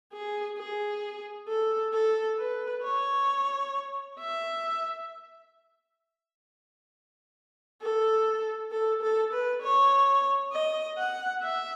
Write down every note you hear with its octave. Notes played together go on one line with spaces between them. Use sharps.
G#4
G#4
A4
A4
B4
C#5
E5
A4
A4
A4
B4
C#5
D#5
F#5
E5